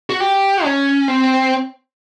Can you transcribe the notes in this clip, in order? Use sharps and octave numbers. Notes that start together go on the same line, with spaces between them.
F#4
G4
C#4
C4